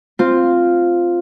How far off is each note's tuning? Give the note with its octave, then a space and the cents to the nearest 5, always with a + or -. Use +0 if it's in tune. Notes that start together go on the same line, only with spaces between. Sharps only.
C4 +0 F4 +0